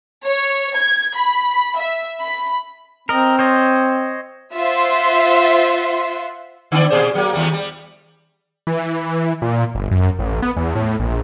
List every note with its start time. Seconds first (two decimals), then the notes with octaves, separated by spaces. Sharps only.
0.23 C#5
0.74 G#6
1.15 B5
1.75 E5
2.21 B5
3.09 C4 A#4 D#5
3.39 C5 C#5 D#5
4.53 F4 C5 E5 F#5 C6
6.72 D3 B3 D5
6.90 A#2 G#4 C5
7.15 F#3 A#3
7.33 D#2 G3
7.53 G3
8.67 E3
9.42 A#2
9.75 G1
9.91 F#2
10.19 A1
10.42 B3
10.57 E2
10.75 A2
10.99 A#1